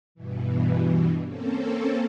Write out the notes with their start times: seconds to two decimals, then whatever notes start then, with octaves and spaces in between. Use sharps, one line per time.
0.15 G2 B2 E3
1.25 A#3 C4 C#4 A4